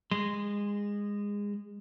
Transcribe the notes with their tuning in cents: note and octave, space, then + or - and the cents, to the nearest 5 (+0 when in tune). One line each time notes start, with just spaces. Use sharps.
G#3 -25 C6 -15